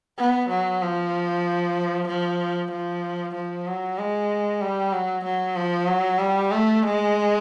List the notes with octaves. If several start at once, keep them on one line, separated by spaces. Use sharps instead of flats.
B3
F#3
F3
F3
F3
F3
F#3
G#3
G3
F#3
F#3
F3
F#3
G3
A3
G#3